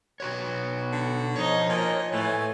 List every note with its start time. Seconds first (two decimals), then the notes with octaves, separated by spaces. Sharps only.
0.20 B2 F#4 B4 C#5
0.59 B3
0.93 D3
1.36 F3 D#4 C#5 D#5
1.69 A#2 D#5
2.12 A2 E3 A3 G#5